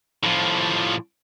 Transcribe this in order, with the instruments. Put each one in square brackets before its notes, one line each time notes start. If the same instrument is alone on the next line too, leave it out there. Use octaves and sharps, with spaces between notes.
[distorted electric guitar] A2 F3